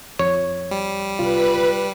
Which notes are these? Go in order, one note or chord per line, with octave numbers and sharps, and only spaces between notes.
F2 C#5
G3
C2 F4 B4